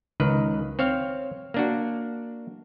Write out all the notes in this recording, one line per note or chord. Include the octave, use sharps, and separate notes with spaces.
C#2 D#3 B4
C4 C#5 F5
A#3 D4 F#4